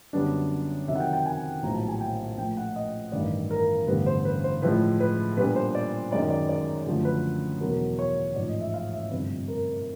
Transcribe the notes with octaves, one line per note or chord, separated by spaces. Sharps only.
F#2 D3 G3 B3 D4
F2 C3 D#3 F#3 E5
F#5
G5
G5
G#5
A#1 A2 F#3 B3 E4 A#5
A5
G#5
G5
A#2 F3 A3 G5
F#5
D#5
A1 G2 D#3 D5
A#4
A1 G2 D3 G3 B3 B4
C5
B4
C5
A2 F3 G#3 B4
B4
A#2 G3 B3 D4 B4
C5
D5
F#2 D#3 G#3 D5
D5
D5
F#2 D3 F3 A3
B4
E2 B2 F#3 A#4
C#5
A1 G#2 F3 D5
D#5
E5
F5
E5
G1 F2 C3 B4
A#4